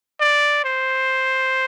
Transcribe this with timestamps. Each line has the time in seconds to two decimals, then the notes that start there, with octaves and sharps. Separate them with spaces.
0.20 D5
0.64 C5